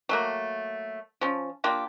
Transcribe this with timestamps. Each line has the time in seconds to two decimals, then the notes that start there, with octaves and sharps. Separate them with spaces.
0.09 F#3 A3 A#3
1.21 F3 C#4
1.64 A#3 D4 F4 G4